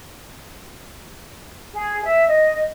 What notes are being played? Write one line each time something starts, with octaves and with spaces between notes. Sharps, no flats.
G#4
E5
D#5